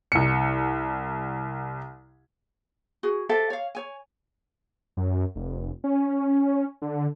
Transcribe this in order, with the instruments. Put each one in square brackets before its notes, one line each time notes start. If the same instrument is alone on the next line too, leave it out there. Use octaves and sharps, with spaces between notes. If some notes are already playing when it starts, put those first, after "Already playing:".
[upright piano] C2 C#7
[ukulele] F#4 G#4
G4 A4 C5 E5
C#5 F5
C#5 G#5
[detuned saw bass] F#2
F1
C#4
D3